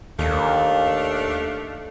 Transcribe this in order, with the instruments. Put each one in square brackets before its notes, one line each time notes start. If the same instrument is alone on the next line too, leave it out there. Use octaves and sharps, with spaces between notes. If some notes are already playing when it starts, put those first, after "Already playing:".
[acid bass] D#2 [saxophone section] A3 D4 F5